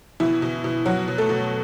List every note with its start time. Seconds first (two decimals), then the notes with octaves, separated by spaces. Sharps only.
0.20 B2 E3 E4
0.42 B2
0.64 B2
0.86 B2 F#3 F#4
1.08 B2
1.18 A3 A4
1.29 B2